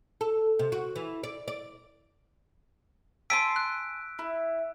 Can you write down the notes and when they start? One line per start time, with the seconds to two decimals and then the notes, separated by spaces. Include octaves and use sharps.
0.21 A4
0.59 C3
0.72 F#4
0.96 E3
1.23 D5
1.48 D5
3.30 G#5 A5 C6 E6 B6 D7
3.56 F#6
4.19 E4